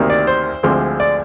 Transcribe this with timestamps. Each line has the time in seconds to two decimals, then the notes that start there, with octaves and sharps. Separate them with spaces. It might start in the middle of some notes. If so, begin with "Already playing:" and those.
Already playing: D2 C3 D#3 A#3
0.10 D5
0.27 C5
0.63 D2 D3 F3 G#3 C4
1.00 D5